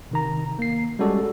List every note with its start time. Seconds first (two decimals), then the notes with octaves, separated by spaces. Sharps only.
0.11 C3 D#3 A#5
0.59 A#3 C7
0.99 G3 G#3 C#4 F#4 A4 D5